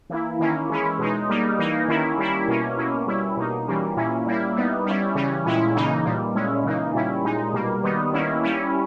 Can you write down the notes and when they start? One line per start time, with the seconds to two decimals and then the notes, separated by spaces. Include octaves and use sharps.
0.10 E3 A#3 E4
0.39 D#3 A#3 C#4 E4
0.70 E3 G#3 C#4 E4
0.99 B2 G#3 D#4
1.29 G3 A#3 D#4
1.59 E3 A#3 D#4
1.88 D#3 A#3 C#4 E4
2.18 G3 A#3 C#4 E4
2.48 B2 A#3 C#4
2.77 B2 A#3 C#4 E4
3.07 G3 C#4 E4
3.37 B2 A#3 D#4
3.67 E3 G3 A#3 C#4
3.97 A#2 A#3 C#4 E4
4.27 G3 A#3 E4
4.56 G3 B3 D#4
4.86 G3 C#4 E4
5.15 C#3 E3 G3 C#4
5.46 A#2 G#3 C#4 E4
5.75 C#3 E3 A#3 D#4
6.04 A#2 G3 A#3
6.35 A#2 G#3 C#4 E4
6.64 C#3 E3 A#3 D#4
6.94 A#2 G3 C#4 E4
7.24 A#2 G#3 D#4
7.53 B2 G3 A#3
7.83 D#3 G3 B3 D#4
8.13 D#3 A#3 C#4 E4
8.43 G3 C#4 E4